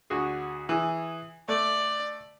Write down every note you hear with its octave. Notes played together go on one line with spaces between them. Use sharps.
D2 F#4 G#4
E3 G#4
A3 D5